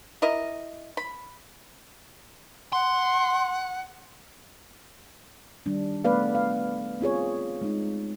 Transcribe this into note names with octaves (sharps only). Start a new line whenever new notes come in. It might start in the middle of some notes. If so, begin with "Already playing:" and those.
E4 A#4 D#5
B5
F#5 C6
D#3 G3 D4
G3 A3 B3 B4 D5 F5
F5
C4 F4 G#4 C#5
G#3 D#4